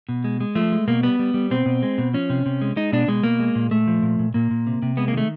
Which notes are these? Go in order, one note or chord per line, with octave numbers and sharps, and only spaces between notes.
B2
G#3
G#3
F3 A3
G#3
B2 A#3
G3 B3
G3
G3
B2 C4
B2
G#3
B2
F3 C#4
C3
C3
G#3
G#3 D#4
B2 D4
B2 G#3
B2 A#3
G#3
A#2
A#2 A3
F3
A#2
A#2
A#2 A#3
A#2
C3
C3
G#3 B3
A#3
D#3 A3